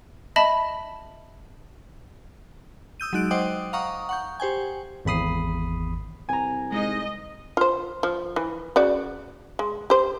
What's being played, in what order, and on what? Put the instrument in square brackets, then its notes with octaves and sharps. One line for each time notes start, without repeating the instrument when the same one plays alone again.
[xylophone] D#5 E5 A5 B5
[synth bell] D#6 E6 G6 D#7
F#3 G#3 D#4 F#6 D7
C5 D#5 F#5 G5 D6 D#6
F5 F#5 A#5 C#6 D#6
F#5 C#6 G6
G4 C5 G5 G#5
[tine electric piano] G#1 E2 B5 D#6 C7
[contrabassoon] C2 [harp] G#5 A#5
[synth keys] G#3 D#4 [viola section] D#5
[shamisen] F4 C5
F3
E3
C#3 F#4 D5
G#3
G4 C5